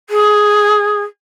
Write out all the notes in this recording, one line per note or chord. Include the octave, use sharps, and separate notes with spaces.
G#4